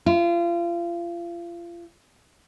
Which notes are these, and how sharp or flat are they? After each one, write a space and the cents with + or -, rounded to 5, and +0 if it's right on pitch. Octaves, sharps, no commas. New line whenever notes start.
F4 -30